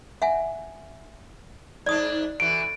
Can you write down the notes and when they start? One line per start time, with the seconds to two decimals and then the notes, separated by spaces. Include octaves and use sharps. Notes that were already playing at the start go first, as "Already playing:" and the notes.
0.22 E5 F#5 G#5
1.86 G#2 D4 D5 D#6
2.40 D3 E3 F#4 D7